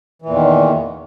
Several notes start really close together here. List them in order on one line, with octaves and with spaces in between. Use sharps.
E3 A#2 E2 D#3